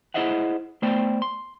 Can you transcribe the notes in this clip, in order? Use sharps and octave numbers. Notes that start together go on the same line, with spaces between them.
E4 G#4 C5 D#5 E5 F#5
A3 B3 C5 D5 G5
C6